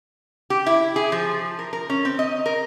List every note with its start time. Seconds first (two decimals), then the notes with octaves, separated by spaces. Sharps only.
0.50 G4
0.66 E4
0.96 G#4
1.12 F3
1.59 A#4
1.73 A#4
1.90 C#4
2.05 C4
2.19 D#5
2.46 A#4